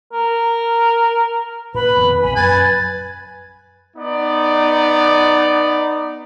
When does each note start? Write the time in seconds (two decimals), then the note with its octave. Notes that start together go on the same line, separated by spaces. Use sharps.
0.13 A#4
1.74 A#2 B4 B5
1.97 F2 B2 D#3
2.22 A#1 C#3 G#5 B5
2.36 F#2 B4 G#5 A6
3.97 B3 D#4 D5